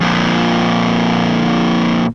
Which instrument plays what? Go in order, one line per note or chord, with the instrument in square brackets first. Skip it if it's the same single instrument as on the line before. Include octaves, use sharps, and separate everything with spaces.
[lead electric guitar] F2 A#2